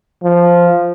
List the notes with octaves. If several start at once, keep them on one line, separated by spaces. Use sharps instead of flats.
F3